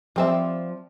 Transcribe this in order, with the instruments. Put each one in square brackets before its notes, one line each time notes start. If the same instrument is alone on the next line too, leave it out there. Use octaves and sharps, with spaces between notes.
[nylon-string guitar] F3 D5 [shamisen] G3 C4 E5